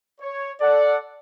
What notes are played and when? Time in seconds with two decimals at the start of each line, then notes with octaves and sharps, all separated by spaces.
0.21 C#5
0.61 A4 D5 F#5